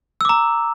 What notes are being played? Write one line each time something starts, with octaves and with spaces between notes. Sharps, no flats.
A#5 D6 E6